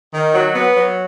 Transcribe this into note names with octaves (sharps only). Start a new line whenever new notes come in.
D#3
F#3
B3
F#3